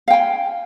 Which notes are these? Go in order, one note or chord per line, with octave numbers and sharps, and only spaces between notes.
F5 G5 G#5